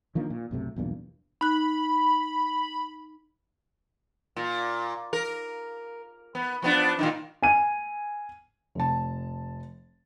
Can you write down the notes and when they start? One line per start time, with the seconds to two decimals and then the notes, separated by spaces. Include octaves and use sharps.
0.15 D#3 F3 A#3 D4
0.30 A#2
0.51 B1 F#2 C3 A3
0.76 B1 E2 G2 A#2
1.41 D#4 B5 F#6
4.36 A#2
5.13 A#4
6.35 B3
6.62 F3 B3 D4
6.99 A#2 D#3 D#4
7.42 G#5 D#7
8.75 F1 A5